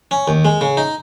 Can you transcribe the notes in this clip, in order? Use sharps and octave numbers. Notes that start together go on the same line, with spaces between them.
C#4
D#2
G#3
C#3
D#4